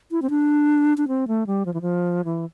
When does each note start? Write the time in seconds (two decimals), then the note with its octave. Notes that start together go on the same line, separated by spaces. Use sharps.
0.11 E4
0.22 C4
0.30 D4
0.98 D4
1.08 C4
1.28 A3
1.47 G3
1.66 F3
1.74 E3
1.82 F3
2.25 E3